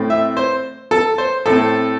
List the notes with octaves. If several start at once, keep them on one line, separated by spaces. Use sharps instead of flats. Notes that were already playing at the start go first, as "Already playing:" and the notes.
Already playing: A2 A3 C4
E5
C5
A4
C5
A2 A3 C4 A4